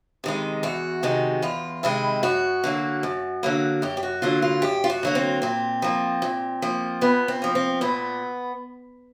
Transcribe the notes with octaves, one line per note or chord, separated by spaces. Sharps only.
C3 D#3 G#3
E2 F#4
C3 D#3 G#3
E2 F4
C3 D#3 G#3 E4
F#2 F#4
D3 F#3 A#3
F#2
D3 F#3 A#3
F#2 G4
G4
F#4
D3 F#3 A#3 F4
F4
F#2 G4
F4
F#4
D3 F#3 A#3
C4
A#2 C4
F3 A#3
A#2
F3 A#3
A#2 B3
C4
F3 A#3
C4
A#2 B3